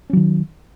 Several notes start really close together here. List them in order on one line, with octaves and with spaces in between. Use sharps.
C#4 F#3 D#3